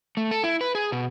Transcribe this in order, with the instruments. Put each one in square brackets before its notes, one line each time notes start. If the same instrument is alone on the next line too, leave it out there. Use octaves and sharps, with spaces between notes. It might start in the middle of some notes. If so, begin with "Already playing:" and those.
[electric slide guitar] A3
A4
E4
B4
G#4
B2